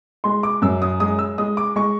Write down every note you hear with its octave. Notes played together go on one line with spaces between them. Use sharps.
G#3 C6
D6
F#2 E6
D#6
G#3 D#6
E6
G#3 D#6
D6
G#3 C#6